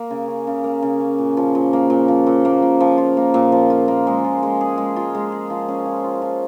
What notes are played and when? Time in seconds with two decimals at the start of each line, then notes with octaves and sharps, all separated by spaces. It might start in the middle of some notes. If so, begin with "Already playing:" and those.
Already playing: A#3
0.10 C#3
0.28 C#4
0.47 C#3
0.64 A#3
0.82 C#3
1.00 C#4
1.18 A#2
1.37 F3
1.55 A#2
1.73 A#3
1.90 A#2
2.08 F3
2.27 A#2
2.45 A#3
2.62 A#2
2.80 F3
2.98 F4
3.17 A#3
3.34 A#2
3.52 F3
3.70 F4
3.88 A#3
4.07 G#3
4.24 F4
4.43 G#3
4.61 G#4
4.78 G#3
4.96 F4
5.15 G#3
5.32 G#4
5.50 F3
5.68 C#4
5.85 F3
6.04 F4
6.22 F3